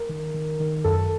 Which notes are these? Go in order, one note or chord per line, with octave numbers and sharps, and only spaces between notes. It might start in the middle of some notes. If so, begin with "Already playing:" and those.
Already playing: A#4
D#3
D#3
D#3
F#2 A4